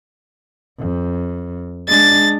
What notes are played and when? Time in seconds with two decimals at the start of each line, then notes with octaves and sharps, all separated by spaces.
0.79 F2
1.88 G#3 D4 A6